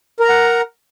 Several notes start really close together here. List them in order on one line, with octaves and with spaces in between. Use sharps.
A#4 A#5 F#5